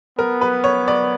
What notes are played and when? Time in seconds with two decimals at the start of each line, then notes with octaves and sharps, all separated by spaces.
0.18 B3 A#4
0.41 B4
0.64 C#5
0.88 D5